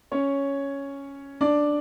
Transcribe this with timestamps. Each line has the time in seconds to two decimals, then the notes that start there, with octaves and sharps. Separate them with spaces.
0.12 C#4 C#5
1.41 D4 D5